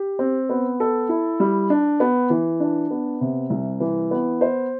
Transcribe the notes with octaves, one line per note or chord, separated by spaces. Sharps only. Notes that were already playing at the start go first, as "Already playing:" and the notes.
Already playing: G4
C4
B3
A4
E4
G3
D4
B3
E3
D4
B3
C3
C2
E3
B3
C5